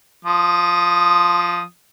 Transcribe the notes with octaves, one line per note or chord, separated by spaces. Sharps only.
F3 D#6